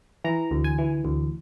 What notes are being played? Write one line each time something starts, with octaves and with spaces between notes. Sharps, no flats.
E3 A#5
D2
G#5
E3
D2